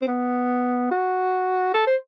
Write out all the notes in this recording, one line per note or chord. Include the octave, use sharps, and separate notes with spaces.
C4
B3
F#4
A4
C5